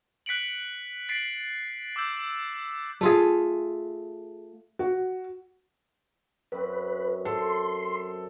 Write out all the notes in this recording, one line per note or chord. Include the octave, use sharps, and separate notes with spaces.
F#6 B6 C#7 D7 F#7
A6 B6 C7 D7 F#7
D6 E6 G6 C7
A3 F4 G#4
F#4
F#2 C4 B4
A4 C6